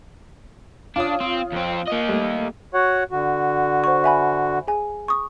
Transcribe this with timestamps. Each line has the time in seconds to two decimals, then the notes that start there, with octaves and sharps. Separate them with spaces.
0.96 D4 F4 C#5 D#6
1.21 C4
1.54 F2 C4
1.88 A#3 D#5
2.09 G3 A3
2.74 F#4 C#5 F#5
3.11 D3 F#4
3.84 C5 C#6
4.04 E5 G#5 B5
4.68 G#4 G#5
5.08 C#6 D#6